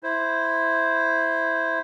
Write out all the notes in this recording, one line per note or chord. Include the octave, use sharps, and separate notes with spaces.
E4 C5